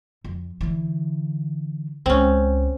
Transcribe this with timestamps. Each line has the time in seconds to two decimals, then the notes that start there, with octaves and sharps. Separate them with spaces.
0.24 F2
0.61 D3 E3
2.06 C#2 G#3 C4 C#4